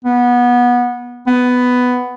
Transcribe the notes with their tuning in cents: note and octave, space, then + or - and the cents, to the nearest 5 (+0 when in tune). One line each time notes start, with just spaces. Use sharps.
B3 -20
B3 +10